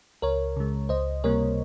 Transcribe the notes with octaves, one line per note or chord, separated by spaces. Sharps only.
C#2 A#4 C#5
C#3 G#3
C#2 C5 D#5
C3 G3 A#3 A#4 C#5